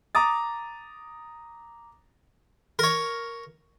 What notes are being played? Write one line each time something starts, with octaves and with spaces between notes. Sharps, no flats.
A#5 D6 D#6 A6
A#4 C#5